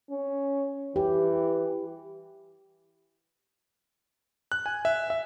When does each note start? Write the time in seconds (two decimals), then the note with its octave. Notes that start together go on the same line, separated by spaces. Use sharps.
0.11 C#4
0.96 E3 G4
4.52 F#6
4.66 G#5
4.85 E5
5.10 E5